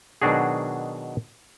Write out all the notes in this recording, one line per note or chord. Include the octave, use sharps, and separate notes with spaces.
B2 D#3 F#3 D4 F#4 G#4